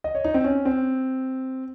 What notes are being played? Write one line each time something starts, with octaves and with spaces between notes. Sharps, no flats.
D#5
C#5
D#4
C4
C#4
C4